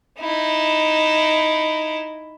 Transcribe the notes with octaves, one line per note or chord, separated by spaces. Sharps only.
D#4 E4